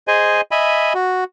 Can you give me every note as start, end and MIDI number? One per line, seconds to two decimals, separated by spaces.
0.08 0.41 68
0.08 0.41 72
0.08 0.41 75
0.08 0.41 80
0.51 0.93 75
0.51 0.93 76
0.51 0.93 80
0.51 0.93 83
0.94 1.24 66